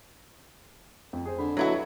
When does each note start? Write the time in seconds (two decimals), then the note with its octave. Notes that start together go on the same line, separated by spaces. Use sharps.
1.13 F2
1.26 G#4 C5
1.38 D3 B5
1.57 F#3 E4 F#4 A4 B4 D#5